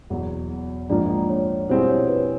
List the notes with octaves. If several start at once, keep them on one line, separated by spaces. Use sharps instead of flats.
E2 B2 F#3
A#1 G#2 F3 A#3 D4 D5
C#5
B2 G3 C4 E4 G#4 C5
C#5
B4